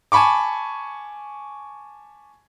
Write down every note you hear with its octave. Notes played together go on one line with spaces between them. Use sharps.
G#5 A5 B5 C#6 D6